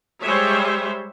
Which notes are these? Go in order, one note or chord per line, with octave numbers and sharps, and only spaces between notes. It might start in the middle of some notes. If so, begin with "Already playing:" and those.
G3 G#3 C5 C#5 E5